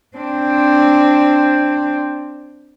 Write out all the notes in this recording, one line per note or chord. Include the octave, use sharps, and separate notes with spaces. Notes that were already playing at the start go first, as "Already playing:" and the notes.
C4 D4